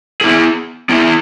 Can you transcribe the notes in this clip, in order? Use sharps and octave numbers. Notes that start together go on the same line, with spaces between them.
B3 E4 G#4
B3 E4 G#4